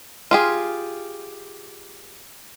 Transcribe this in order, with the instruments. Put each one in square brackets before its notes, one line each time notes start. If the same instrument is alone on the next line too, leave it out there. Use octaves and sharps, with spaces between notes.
[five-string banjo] F4 G4 G#4